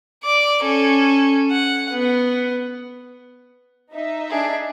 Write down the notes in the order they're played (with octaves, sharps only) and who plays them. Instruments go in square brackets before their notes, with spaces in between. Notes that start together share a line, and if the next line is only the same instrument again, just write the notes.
[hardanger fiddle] D5 D6
C#4 A4
F#5
B3
[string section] D#4 E5
[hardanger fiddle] D4 G#4